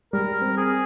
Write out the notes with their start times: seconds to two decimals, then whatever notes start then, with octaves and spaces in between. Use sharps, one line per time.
0.13 G3 A#4
0.41 C4
0.57 G#4